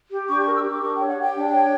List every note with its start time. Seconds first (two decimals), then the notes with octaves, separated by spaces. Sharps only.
0.11 G4
0.28 D4 C#6
0.42 A#4 C#6
0.55 E6
0.64 G4 D6
0.81 D4 C#6
0.95 C#5 G5
1.08 F#5
1.17 G4 G5
1.35 D4
1.53 C#5